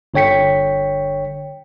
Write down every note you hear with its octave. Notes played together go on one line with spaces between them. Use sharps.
G1 D3 C#5 G5 B6 C#7